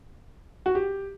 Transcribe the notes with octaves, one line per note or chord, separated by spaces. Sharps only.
F#4
G4